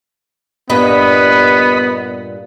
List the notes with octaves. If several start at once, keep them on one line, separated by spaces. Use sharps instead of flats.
G2 A#2 B3 D#5 B5